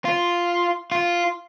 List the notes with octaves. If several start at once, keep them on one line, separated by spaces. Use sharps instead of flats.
F4
F4